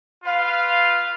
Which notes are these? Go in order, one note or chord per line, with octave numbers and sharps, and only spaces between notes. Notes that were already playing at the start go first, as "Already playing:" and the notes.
F4 B4 F5